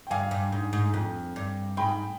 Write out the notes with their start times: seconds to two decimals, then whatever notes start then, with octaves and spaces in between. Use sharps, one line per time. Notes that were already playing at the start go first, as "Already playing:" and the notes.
0.07 G5
0.11 G2 F5 G#5
0.31 G2
0.52 G#2
0.73 G#2
0.94 F2
1.36 G2
1.77 G#2 G5 B5